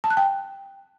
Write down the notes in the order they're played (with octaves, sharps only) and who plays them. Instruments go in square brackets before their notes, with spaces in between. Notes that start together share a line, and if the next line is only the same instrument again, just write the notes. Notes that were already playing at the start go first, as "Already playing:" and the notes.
[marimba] A5
F#6
G5